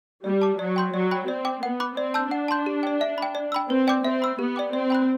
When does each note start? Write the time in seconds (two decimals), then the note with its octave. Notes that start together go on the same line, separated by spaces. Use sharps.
0.24 G3 D5
0.42 A5 D6
0.59 F#3 D5
0.76 G5 C6 G6
0.94 F#3 D5
1.11 G5 B5 F#6
1.28 C4 D5
1.45 G5 D6
1.63 B3 F#5
1.80 B5 D6 F#6
1.97 C4 D5
2.14 A5 E6 G6
2.31 D4 F#5
2.48 A5 C6 G6
2.66 G4
2.83 D5 G5
3.01 E5
3.18 G5 B5
3.35 D5
3.52 G5 B5 E6
3.70 C4 B4
3.87 D5 G5 D6 G6
4.04 C4 E5
4.22 B5 E6
4.39 B3 G4
4.56 D5 G5 D6
4.73 C4 D5
4.90 G5 B5 F#6